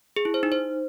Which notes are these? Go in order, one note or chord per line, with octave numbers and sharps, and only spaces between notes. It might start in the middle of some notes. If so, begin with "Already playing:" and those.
G#4
E4
C5
D#4
C5